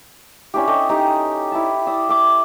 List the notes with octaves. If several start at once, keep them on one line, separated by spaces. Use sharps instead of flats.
C#4 D4 E4 G4
G4 A4 C#5 D#5
D#4 G4
E4 D5 A5
D5 E5 D#6
E5 D6